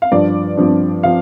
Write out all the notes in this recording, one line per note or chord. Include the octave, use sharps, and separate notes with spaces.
F5
G2 F3 D4 D5
G2 F3 D4
F3 F5